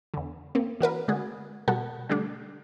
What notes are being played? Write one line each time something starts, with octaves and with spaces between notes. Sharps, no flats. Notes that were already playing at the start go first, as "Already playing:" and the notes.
E2 D3
A#3 C4
E3 F#4 A#4 B4
D3 G#3 F#4 G#4
B2 G3 F#4 A4 A#4 F#5
D3 G3 A3 D4